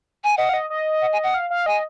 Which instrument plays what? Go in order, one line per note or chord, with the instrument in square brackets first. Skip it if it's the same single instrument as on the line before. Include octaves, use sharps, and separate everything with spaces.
[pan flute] G#5
[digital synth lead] D#5 [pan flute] F#5
[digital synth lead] F5
D#5
D#5
[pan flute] F#5
G#5
F#5
[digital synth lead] F5
F5
[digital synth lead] D#5 [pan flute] G#5